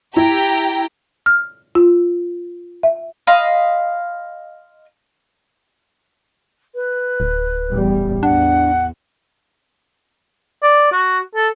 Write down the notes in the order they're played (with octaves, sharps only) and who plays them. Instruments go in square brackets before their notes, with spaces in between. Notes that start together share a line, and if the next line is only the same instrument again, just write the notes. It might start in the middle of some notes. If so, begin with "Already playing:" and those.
[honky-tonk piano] E4 [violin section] G4 G5 A#5
[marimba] F6
F4
E5
[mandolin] D#5 F5 B5 C6
[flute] B4
[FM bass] D1
[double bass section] A1 E2 G3
[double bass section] E2 [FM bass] D4 [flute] F#5
[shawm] D5
F#4
A4